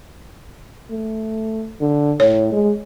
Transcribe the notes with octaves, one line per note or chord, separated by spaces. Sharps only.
A3
D3
A2 C#5
G#3